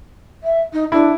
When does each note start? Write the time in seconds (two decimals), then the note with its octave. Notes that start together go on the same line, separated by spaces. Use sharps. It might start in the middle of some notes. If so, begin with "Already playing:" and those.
0.43 E5
0.73 D#4
0.92 D4 E4